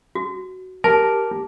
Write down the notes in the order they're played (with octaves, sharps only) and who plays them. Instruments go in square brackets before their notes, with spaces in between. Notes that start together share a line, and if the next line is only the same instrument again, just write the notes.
[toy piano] F#4
[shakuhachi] G4 [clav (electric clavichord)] A#4 [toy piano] A5